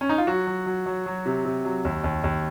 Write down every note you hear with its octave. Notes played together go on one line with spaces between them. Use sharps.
C#4
D#4
F4
F#3 F#4
F#3
F#3
F#3
F#3
C3
C3
F#3
D#2
D#2
D#2